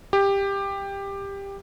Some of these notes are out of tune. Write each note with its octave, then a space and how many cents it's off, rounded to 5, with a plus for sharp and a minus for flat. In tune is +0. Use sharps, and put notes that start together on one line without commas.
G4 +15